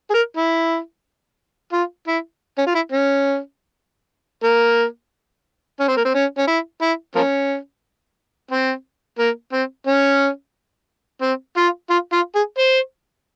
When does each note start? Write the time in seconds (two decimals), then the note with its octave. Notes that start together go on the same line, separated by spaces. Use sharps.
0.10 G#4
0.14 A#4
0.37 E4
1.72 F4
2.07 E4
2.58 C#4
2.66 F4
2.75 E4
2.92 C#4
4.43 A#3
5.80 C#4
5.88 C4
5.97 A#3
6.05 C4
6.14 C#4
6.38 C#4
6.47 E4
6.81 E4
7.15 F3 A#3 C#4
8.51 C4
9.19 A#3
9.52 C4
9.87 C#4
11.22 C4
11.57 F4
11.90 F4
12.13 F4
12.35 G#4
12.58 C5